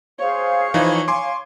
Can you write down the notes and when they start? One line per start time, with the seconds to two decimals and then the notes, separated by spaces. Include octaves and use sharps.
0.19 G#4 C5 C#5 F5
0.74 E3 F3 D#4
1.08 F5 G#5 C6 D6